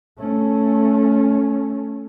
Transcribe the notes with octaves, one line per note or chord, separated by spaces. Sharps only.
A3 C#4